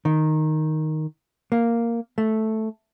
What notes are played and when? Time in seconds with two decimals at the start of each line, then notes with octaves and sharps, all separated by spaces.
0.05 D#3
1.52 A#3
2.18 A3